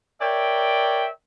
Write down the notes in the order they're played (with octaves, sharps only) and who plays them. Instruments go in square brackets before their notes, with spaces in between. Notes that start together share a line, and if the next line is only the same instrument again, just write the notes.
[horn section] A#4 C#5 D5 E5 G5